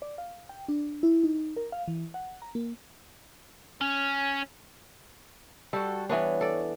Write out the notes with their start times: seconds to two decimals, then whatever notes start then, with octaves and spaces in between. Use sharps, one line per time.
0.02 D5
0.18 F5
0.49 G5
0.68 D4
1.03 E4
1.23 D#4
1.56 A#4
1.72 F5
1.88 E3
2.14 F#5
2.42 A#5
2.55 A#3
3.81 C#4
5.73 G3 F#4 A4
6.09 E3 B3 D4 C#5
6.41 A4 D5